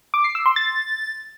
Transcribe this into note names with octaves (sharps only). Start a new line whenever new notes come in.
D6
C7
E6
C6
A6